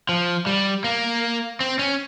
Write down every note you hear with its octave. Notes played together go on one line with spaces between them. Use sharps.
F3
G3
A#3
C4
C#4